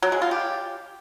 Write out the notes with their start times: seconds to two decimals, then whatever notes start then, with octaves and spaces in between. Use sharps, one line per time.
0.02 F#3
0.12 G#3
0.22 F4
0.31 G4